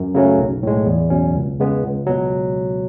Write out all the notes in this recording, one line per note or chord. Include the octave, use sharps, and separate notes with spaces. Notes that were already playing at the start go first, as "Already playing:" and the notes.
Already playing: F#2
C#3 F#3 A3 C#4
B1
A2 G#3
E2
B2 F#3 C#4
C#2
C#3 G#3 B3
C#2
B2 F#3